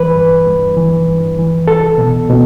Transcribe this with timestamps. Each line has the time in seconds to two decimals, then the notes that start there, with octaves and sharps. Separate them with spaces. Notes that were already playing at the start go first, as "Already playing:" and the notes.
Already playing: E3 B4
0.16 G2
0.47 G2
0.77 E3
1.07 G2
1.38 E3
1.68 C2 A4
1.98 B2
2.29 B2